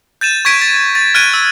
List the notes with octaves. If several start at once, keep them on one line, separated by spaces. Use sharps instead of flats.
G6 A6 D#7 E7
C#6 G#6 B6 D7 D#7
A6
A6
F6 F#6 G#6 D7 D#7
E6